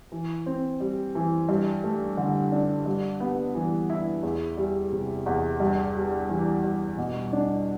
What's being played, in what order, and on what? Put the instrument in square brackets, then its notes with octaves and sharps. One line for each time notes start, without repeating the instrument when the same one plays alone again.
[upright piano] E3
C4
G3
E3
G2
A3
D3
D4
G2
B3
E3
E4
E2
G3
C3
E2
G2
G3
E3
G2
B2
D4